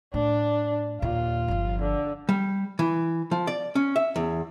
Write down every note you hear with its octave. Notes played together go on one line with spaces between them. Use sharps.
A2 D4
D#2 A#2 F4
G1 F3
D3
G3
E3
F3
D5
C#4
E5
E2